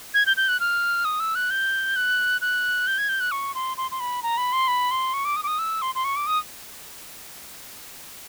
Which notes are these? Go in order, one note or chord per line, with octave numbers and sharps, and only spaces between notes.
G#6
G6
G6
F#6
F6
D#6
E6
F#6
G6
F#6
F#6
G6
G#6
G6
F#6
C#6
C6
C6
C6
B5
A#5
B5
C6
B5
C6
C#6
D6
D#6
D6
D#6
E6
C6
C6
C#6
D6
D#6